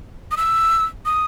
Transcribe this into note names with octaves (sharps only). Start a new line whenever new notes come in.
D#6
E6
D#6